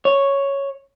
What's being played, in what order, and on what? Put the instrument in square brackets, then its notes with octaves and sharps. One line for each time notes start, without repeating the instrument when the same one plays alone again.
[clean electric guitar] C#5